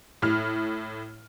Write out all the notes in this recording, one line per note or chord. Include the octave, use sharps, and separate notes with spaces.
A2 F6